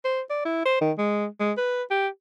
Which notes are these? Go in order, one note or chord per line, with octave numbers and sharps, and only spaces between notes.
C5
D5
E4
C5
D#3
G#3
G#3
B4
G4